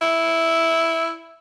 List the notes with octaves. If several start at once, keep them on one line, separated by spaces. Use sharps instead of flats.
E4